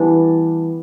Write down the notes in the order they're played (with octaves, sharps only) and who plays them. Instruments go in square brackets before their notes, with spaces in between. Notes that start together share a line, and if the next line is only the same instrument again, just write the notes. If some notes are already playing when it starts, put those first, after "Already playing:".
Already playing: [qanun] E3 G3 B3 D4